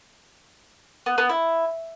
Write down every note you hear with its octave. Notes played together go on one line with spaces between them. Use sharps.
B3
B3
E4